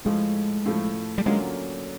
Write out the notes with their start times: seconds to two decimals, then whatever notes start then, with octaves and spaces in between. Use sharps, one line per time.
0.05 A2 F3 G#3 A3
0.66 A2 F3 A3
1.18 G3
1.26 D3 F#3 G#3 A#3 C#4 F4